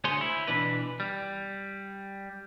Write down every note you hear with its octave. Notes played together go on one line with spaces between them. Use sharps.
D2 G#4 C5 C#5 G#5 C6
E4
B2 E3 D4 B4
G3